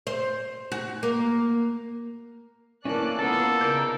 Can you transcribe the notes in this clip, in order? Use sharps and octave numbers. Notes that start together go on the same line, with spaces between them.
C5
F#4
A#3
E3 A#3 C#4 A4 D5 F#6
A#3 B3 F4 A4 A5
C#3 D#4 A#4 D5 G6